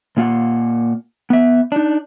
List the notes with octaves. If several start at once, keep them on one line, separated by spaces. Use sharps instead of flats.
A#2 A#3 F4 F#5
B3 E5
D4 D#4